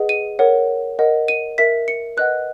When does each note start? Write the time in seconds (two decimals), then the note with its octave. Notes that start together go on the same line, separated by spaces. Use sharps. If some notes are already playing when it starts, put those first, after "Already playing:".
Already playing: G#4 B4 D#5 F#5
0.09 D#7
0.39 A#4 C#5 F#5
0.99 A#4 D#5 F#5
1.28 D#7
1.58 A#4 E5 B6
1.88 C#7
2.17 B4 D#5 F#5 F#6